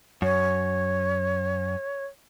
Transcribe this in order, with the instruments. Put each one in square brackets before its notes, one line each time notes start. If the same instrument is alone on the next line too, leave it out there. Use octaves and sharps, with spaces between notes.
[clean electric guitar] F#2 [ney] C#5